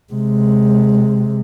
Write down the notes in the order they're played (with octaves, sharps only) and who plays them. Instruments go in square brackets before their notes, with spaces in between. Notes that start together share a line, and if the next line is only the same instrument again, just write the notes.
[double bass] C3 G#3